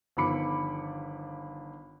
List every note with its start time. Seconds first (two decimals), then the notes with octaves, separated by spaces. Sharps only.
0.17 G1 D#3 F3 B5 D6 C#7